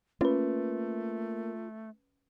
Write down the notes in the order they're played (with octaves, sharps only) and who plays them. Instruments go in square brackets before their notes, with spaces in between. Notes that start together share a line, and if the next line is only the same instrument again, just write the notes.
[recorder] A3 [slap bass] A#3 [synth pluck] C#4 B4 [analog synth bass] F4